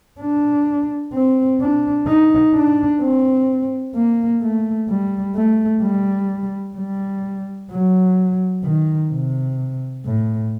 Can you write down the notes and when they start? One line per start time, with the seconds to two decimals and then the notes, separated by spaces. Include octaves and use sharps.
0.21 D4
1.14 C4
1.61 D4
2.08 D#4
2.55 D4
3.01 C4
3.96 A#3
4.42 A3
4.90 G3
5.36 A3
5.83 G3
6.77 G3
7.72 F#3
8.65 D#3
9.12 C3
10.06 A2